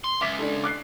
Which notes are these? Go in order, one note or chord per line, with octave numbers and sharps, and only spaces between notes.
C6
C#2 E5 D6 B6
D4 A4
D6 F#6 C7